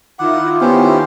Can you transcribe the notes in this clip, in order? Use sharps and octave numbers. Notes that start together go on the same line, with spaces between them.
D#3 E4 F4 F#5 D6
B3 C#4 G4 C5